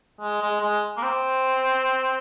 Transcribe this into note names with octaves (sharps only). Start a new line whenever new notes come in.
G#3
G#3
G#3
A#3
C4